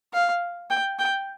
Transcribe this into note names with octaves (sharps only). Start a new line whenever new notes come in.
F5
G5
G5